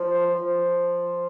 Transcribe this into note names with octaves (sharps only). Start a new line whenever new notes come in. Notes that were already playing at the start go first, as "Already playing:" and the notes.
Already playing: F3
F3